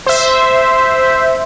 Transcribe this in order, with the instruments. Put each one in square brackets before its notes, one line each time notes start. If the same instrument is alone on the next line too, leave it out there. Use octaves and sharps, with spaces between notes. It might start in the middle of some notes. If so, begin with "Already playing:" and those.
[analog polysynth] C5 E5